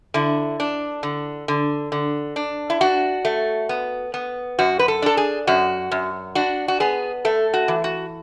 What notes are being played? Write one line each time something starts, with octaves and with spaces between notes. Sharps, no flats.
D3 E4
D4
D3
D3
D3
D4
E4
D4 F#4
A3
B3
B3
F#2 F#4
B4
A4
D4 A4
G#4
F#2 F#4
F#2
D4 F#4
F#4
B3 G#4
A3 A4
F#4
E3
F#4